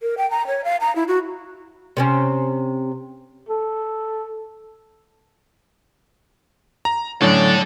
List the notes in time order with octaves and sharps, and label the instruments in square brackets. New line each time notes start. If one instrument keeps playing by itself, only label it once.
[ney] A#4
G5
A#5
C#5
F5
A#5
E4
F#4
[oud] C3 C4 C#4
[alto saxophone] A4
[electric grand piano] A#5
[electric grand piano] A2 D3 [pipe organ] F#3 [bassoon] C#4 [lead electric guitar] A4 D5